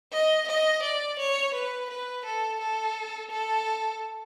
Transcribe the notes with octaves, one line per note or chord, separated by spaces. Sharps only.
D#5
D#5
D5
C#5
B4
B4
A4
A4
A4